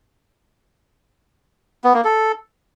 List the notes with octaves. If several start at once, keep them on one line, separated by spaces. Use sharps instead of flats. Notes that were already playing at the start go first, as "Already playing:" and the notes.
B3
A#3
A4